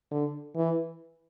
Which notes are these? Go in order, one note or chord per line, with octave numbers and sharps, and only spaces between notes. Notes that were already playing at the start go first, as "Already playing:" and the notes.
D3
E3